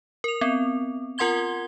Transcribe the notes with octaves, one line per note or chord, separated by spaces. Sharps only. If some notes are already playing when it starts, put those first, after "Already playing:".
A#4 F7
B3 C4
F4 A#4 F#5 C6 G#6 G7